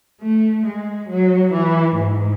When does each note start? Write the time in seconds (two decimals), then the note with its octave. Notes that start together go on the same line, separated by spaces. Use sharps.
0.21 A3
0.66 G#3
1.09 F#3
1.53 E3
1.98 G#2